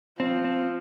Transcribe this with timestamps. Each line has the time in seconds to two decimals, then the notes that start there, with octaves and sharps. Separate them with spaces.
0.20 F3 C4
0.44 C4